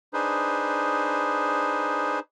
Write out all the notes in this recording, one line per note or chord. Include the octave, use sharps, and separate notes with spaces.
D4 D#4 G#4 B4 C5